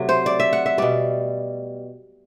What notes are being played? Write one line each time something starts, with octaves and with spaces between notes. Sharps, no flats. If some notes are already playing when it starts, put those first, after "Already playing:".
Already playing: C3 F#3 A3
C5
D5
E5
F#5
E5
B2 G3 D5